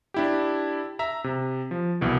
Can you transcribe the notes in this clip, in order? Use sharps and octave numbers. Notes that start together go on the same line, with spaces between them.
D4 E4 G4
E5 A#5
C3
F3
C2 B2 E3